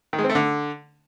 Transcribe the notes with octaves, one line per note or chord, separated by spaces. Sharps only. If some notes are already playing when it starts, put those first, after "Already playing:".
D#3
G#3
C4
A3
D3